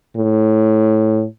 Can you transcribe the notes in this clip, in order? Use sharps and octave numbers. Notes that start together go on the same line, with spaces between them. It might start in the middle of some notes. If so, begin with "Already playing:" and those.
A2